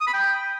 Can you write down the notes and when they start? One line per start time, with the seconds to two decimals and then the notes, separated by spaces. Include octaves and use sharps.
0.01 D#6
0.07 B5
0.13 G5